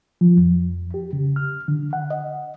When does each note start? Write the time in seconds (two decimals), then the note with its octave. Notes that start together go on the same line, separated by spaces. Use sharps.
0.21 F3
0.37 F2
0.94 G4
1.13 C#3
1.36 F6
1.68 D3
1.93 F#5
2.11 D#5